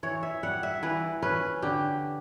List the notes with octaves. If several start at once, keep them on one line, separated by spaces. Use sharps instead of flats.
E3 C#5
E5
G3 F#5
E5
E3 B4
C#4 B4
D3 G4